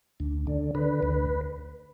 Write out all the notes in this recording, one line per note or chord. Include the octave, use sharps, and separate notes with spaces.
D2
D3
D3 B4
D2